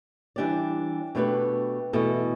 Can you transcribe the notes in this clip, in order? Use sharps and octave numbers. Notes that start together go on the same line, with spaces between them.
E3 G3 D4 G4 D5
B2 A3 D4 G4 B4
E2 B2 A3 E4 A4